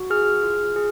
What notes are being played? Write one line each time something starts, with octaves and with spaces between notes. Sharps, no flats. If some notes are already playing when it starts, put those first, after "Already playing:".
Already playing: F#4
G#4 F6
F4
G#4